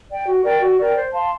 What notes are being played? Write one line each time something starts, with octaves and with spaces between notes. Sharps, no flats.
D5 G5
F#4
A#4 D5 G5
F#4
A#4 D5 G5
C5
F5 A5 C6